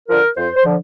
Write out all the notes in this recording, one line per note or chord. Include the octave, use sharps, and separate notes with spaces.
D3 F3 A#4
F2 C5
C5
D3 F3